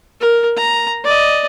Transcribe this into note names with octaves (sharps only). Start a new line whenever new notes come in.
A#4
A#5
D5 D#5